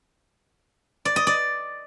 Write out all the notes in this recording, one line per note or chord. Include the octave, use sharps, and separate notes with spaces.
D5
D#5
D5